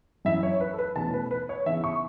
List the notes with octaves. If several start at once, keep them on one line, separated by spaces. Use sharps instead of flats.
F#2 E3 C#4 E4 E5
C#5
B4
A4
B4
E2 B2 A3 C#4 E4 A5
B4
B4
C#5
C#3 E3 B3 E4 E5
C#6